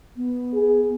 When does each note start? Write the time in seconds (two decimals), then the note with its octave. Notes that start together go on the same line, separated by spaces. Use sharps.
0.17 B3
0.54 G#4